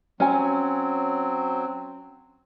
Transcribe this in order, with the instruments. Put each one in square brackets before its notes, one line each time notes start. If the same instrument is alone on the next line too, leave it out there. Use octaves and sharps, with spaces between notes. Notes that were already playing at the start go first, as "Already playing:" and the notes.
[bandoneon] F#3 C4 [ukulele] C#4 G#5